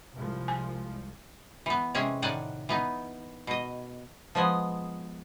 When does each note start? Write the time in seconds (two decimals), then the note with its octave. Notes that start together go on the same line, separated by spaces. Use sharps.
0.15 C2 F3 G#3
0.48 G#5
1.66 E3 B3
1.95 C3 G#3 C#4 G#4 G#5
2.22 A2 D#3 D5 F#5 G#5
2.69 E3 B3 D#4
3.47 B2 D#5
4.35 F3 G#3 B3 D#5 G#5